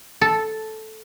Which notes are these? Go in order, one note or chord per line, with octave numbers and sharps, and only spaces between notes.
A4